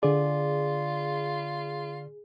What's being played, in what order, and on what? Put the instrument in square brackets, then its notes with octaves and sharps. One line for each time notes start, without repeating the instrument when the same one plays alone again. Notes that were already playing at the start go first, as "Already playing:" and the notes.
[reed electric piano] D3 D5 [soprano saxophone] F4 [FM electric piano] G#4